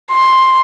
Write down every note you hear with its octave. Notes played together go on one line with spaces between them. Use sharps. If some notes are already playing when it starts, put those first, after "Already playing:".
C6